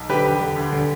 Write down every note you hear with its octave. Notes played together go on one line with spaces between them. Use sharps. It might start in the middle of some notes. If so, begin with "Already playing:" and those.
Already playing: B1
D3 G4 B4
E1
D3
D2
D3